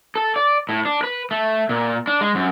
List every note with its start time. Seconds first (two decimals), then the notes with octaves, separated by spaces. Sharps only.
0.16 A4
0.36 D5
0.69 A2
0.85 D4
1.03 B4
1.31 A3
1.69 A#2
2.07 D4
2.21 G#3
2.35 F#2